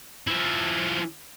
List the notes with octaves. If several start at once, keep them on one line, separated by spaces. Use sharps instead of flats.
F3 E4